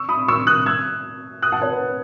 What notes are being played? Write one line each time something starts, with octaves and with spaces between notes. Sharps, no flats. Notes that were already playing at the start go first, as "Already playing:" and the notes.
Already playing: C#6 E6
B5 D#6
C#6 E6
D#6 F#6
E6 G#6
D#6 F#6
F#5 A5
C#5
B4